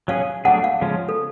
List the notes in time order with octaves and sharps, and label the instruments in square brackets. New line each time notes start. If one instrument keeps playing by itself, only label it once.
[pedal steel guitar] F#3 C#4 G#4 [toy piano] F5
[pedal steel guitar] F#3 A3 D4 G#4 [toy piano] F#5
[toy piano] F5
[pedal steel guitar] C#3 F3 G#3 C#4
[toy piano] A4